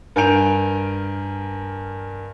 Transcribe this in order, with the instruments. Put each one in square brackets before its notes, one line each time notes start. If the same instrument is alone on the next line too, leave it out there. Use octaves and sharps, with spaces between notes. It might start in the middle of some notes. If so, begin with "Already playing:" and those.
[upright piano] G2 A#4 G#5 G6 D7 F7